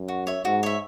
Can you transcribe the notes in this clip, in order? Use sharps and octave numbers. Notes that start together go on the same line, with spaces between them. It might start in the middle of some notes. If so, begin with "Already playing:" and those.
Already playing: F#2
F#4
C#5 E5
G#2 F#4
C#5 E5